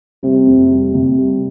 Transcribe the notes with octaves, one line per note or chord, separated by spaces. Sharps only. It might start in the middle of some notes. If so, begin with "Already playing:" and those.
C3 G3
F2
G3
C3
G3